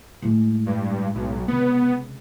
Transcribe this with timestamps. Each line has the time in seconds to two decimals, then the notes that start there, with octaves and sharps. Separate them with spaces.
0.22 A2 G#3
0.66 G2
1.15 B1
1.48 C#2 C3 B3